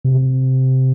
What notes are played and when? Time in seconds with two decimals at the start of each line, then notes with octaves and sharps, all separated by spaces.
0.05 C3